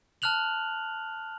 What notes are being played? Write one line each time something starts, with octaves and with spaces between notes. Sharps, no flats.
A5 F6 F#6 F7 F#7